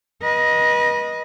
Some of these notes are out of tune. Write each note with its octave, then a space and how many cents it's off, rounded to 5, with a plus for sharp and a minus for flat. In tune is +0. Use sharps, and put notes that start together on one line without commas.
B4 -35 D#5 +0